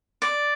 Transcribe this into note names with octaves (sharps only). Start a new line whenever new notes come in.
D5